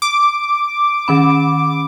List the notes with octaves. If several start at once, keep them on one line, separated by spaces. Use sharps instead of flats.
D6
D#3 C#4 B5